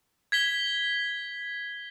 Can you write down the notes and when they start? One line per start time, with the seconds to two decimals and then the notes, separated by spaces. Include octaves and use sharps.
0.32 G#6 B6 G7